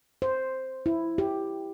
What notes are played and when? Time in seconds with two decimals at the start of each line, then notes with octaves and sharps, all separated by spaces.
0.22 C5
0.86 E4
1.18 G4